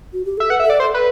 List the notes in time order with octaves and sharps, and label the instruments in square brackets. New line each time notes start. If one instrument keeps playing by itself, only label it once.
[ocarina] F#4
G4
[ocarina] A4 [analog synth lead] E5
[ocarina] B4 [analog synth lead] F#5
[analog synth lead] E5
[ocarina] A4 [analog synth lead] D5
[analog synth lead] C5
B4